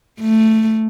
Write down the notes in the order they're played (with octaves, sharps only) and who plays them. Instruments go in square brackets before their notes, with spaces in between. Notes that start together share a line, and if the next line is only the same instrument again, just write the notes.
[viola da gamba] A3